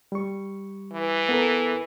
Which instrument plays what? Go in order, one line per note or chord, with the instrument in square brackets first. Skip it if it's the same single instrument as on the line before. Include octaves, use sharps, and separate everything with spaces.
[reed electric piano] G3 C#6
[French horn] E3
[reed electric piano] B3 A4 A#4